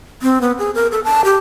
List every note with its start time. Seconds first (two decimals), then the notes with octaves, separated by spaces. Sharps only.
0.22 C4
0.41 B3
0.59 G#4
0.75 A#4
0.92 A4
1.04 A5
1.24 G4